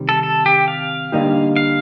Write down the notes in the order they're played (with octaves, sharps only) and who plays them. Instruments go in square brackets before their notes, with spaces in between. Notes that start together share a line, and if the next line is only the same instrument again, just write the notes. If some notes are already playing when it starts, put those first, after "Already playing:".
Already playing: [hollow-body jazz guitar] C3 D#3 G3 C4
[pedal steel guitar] A4
A4
G4
F5
[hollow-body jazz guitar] D3 G3 A#3 D#4 G4
[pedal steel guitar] F5